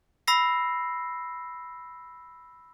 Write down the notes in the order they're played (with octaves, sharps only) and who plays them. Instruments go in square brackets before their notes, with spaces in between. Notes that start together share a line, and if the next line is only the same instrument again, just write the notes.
[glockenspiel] B5 E6 A#6 C7